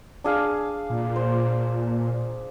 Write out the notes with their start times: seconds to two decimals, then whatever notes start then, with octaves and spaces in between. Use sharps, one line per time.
0.24 D4 G#4 F5
0.90 A#2
1.16 C5